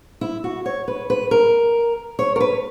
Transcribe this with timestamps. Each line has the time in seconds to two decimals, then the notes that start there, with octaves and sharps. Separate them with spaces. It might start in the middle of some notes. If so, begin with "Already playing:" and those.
0.21 E4
0.44 F#4
0.66 C#5
0.88 B4
1.10 B4
1.31 A#4
2.19 C#5
2.36 A#4
2.40 B4